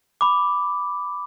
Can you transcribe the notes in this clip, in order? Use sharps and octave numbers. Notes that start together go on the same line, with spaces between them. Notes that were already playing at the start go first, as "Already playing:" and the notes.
B5 D6